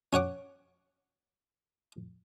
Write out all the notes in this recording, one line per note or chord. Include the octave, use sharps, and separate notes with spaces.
C#4 C#5 F#5 D6